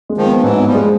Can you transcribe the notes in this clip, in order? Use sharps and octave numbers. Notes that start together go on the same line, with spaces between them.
G#3
D#3 F3
B3
F3
G#2 E3 F#3
B3
F3 G3
G#3